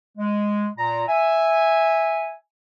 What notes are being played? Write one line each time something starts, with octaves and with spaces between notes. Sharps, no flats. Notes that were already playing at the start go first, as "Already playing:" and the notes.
G#3
A#2 A#5
E5 G#5